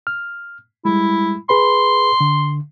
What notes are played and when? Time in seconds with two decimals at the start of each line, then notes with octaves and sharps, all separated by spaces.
0.07 F6
0.85 G3 G#3 E4
1.49 G#4 B4 B5 C6
2.21 D3